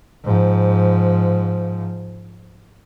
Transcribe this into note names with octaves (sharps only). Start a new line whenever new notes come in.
G#2 F3